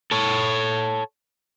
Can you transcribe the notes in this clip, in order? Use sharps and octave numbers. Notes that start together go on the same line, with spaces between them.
A4 C#5